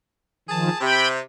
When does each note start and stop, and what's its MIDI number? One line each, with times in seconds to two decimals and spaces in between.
0.49 0.69 51
0.49 0.69 53
0.49 0.80 68
0.49 0.80 81
0.81 1.19 48
0.81 1.08 79
0.81 1.08 83